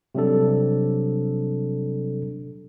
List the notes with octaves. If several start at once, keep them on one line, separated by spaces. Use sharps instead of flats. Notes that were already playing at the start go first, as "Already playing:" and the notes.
C3 F#3 G3 D4 A4